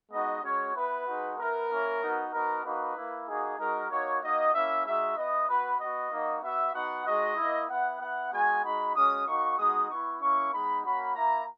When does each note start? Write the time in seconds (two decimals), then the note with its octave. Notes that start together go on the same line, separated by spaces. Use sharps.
0.11 G#3 B3 D#4 F#4 D#5
0.43 G#3 C#4 F#4 C#5
0.74 B3 E4 B4
1.06 G#3 D#4 F#4
1.38 B3 E4 A#4
1.69 A#3 C#4 E4
2.01 B3 D#4 F#4
2.32 B3 D#4 F#4 A#4
2.64 A#3 D#4 F#4 B4
2.96 A#3 E4
3.27 A#3 D#4 F#4 G#4
3.58 G#3 D#4 F#4 A#4
3.90 A#3 D#4 F#4 C#5
4.22 A#3 D#4 F#4 D#5
4.53 A#3 C#4 E4 E5
4.84 G#3 D#4 F#4 E5
5.16 B3 E4 D#5
5.48 B3 F#4 B4
5.79 B3 F#4 D#5
6.11 A#3 D#4 F#4
6.42 B3 F#4 E5
6.73 B3 D#4 F#4 F#5
7.05 G#3 D#4 F#4 D#5
7.36 A#3 E4
7.68 B3 E4 F#5
8.00 B3 E4 F#5
8.31 G#3 B3 F#4 G#5
8.63 G#3 D#4 F#4 B5
8.94 G#3 C#4 F#4 D#6
9.26 A#3 D#4 F#4 C#6
9.57 G#3 B3 D#4 F#4 D#6
9.89 B3 E4 C#6
10.20 A#3 C#4 E4 C#6
10.52 G#3 B3 D#4 B5
10.83 A#3 C#4 F#4 B5
11.15 A#3 E4 A#5